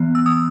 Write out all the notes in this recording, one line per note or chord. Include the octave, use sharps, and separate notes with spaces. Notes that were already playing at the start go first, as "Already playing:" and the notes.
Already playing: E3 B3
E6
D#6